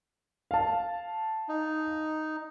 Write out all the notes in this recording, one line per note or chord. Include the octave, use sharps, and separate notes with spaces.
F5 A5
D#4